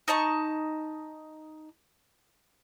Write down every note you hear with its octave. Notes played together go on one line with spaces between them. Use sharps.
D#4 D#5 A5 C#6